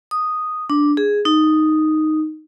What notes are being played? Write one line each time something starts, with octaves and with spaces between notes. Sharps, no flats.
D#6
D4
G#4
D#4